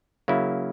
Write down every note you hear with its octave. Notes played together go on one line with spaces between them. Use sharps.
C#3 F#3 A#3 E4